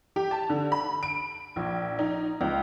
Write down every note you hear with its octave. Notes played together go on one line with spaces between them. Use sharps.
G4
A5
D3
B5
D7
A#1
D#4
C#2